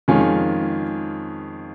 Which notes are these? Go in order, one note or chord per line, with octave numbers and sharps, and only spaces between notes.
F2 D#3 G#3 C#4 F4